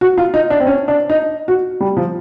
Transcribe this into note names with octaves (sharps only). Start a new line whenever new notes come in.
F#4
F4
D#4
D4
C4
C#4
D4
D#4
F#4
G3
F3